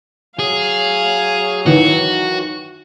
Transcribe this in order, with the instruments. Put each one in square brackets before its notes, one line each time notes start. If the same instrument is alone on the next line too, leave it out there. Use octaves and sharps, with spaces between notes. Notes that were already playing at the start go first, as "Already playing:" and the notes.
[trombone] F#3 [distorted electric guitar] G#4 [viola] F5 G#5
[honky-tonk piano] D#3 E3 [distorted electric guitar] F#4